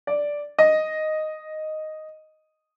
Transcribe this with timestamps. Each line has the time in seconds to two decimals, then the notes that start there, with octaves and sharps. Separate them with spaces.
0.07 D5
0.59 D#5